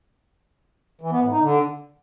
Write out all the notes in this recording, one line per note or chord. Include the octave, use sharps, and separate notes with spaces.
E3
B3
A2
D#4
D3